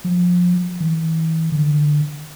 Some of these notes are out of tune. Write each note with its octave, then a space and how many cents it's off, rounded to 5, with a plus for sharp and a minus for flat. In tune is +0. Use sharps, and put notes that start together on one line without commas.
F3 +25
E3 -35
D3 +10